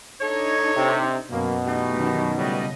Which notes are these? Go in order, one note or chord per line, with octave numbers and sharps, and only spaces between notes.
D4 D#4 A4 C#5
C3
F#2 B2 A#3
E3 A3 D#4 G4
F#2 D#3
A2 C#3 F#3 G3 D#5